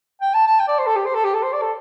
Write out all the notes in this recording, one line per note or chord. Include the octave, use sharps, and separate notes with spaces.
G5
A5
A5
G5
D5
C5
A4
G4
C5
A4
G4
A4
C5
D5
A4